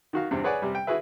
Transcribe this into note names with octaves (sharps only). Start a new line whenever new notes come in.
D#3 F#4 F5
E2 G2 C3 C4
G#4 B4 C#5 D5 F#5 G#5
C3 G3
G5
E4 F#4 G#4 B4 E5